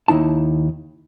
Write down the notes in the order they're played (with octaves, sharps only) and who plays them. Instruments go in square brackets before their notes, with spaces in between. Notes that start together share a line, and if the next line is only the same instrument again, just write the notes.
[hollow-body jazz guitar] D#2 D#4 E4 A5